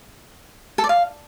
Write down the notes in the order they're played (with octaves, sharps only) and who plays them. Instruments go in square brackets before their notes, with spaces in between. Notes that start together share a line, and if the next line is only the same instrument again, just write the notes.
[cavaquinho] A4
D5
F5